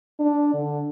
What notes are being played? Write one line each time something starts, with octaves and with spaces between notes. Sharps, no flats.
D4
D3